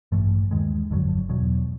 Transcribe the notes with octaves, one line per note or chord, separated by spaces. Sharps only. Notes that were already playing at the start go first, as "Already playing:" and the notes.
A1 G2 E3 A3
D#2 D#3 G#3
G1 F2 D3 F#3
E2 B2 F#3